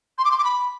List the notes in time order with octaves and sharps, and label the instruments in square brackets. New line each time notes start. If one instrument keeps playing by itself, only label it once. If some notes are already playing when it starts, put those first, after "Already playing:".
[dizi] C6
D6
C6
D6
B5